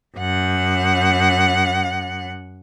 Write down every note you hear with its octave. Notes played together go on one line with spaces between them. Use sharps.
F#2 F#5